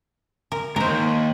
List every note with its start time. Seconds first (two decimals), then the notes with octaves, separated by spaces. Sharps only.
0.52 A#4
0.76 D#2 G#2 A#4 C5